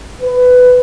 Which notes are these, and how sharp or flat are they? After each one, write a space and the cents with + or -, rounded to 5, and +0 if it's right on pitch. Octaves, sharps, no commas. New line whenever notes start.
B4 +15